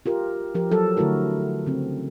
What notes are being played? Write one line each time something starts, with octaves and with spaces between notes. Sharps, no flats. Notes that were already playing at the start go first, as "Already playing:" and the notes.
F4 G4 A#4
F3 G4 A#4
F#3 A4
D3 A3 E4 F#4 A#4
C#3 C4